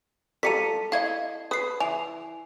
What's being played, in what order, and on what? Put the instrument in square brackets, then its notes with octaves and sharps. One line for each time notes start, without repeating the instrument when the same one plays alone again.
[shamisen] G3 F4 A#5 [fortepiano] A4 [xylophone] B6 C#7 D#7
[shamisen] E4 D#5 [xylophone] F5 G#6
[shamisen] B4 [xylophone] D#6 C7
[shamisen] E3 [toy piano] G#5 [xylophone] F7